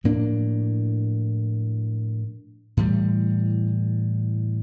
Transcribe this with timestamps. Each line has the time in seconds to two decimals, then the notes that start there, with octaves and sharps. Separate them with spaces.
0.04 A2 F3 A#3 D4
2.77 A2 E3 G3